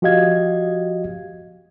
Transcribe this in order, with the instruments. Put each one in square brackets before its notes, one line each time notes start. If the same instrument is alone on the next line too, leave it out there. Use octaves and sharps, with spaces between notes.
[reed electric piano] F3 F#4 G4 D#5 F5 G#6